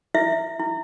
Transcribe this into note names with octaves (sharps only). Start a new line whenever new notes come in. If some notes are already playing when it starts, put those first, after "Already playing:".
E4 E5
E4